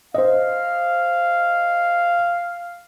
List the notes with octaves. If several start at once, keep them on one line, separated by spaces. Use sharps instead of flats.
C5 D#5 F5